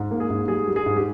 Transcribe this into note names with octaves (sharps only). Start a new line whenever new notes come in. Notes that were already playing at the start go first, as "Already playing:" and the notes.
Already playing: G#2
A#3
G#4
G#2
G3 G#4
G3
G#4
G#2
G4